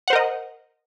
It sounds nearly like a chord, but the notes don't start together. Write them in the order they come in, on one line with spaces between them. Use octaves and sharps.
F#5 C5 A#4 D#5